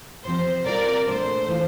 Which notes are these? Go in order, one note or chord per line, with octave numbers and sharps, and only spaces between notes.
C3 F3 C4 C5
C3 G3 C4 F4 A#4 D5
A#2 A3 D4 C5
E3 A3 D4 F4